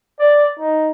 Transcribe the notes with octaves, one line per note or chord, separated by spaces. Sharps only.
D5
D#4